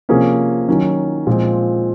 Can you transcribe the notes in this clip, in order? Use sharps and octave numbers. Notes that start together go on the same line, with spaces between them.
C3 F3 A#3 C#4 G#4
D#3 F#3 C#4
A#2 F3 G#3 C4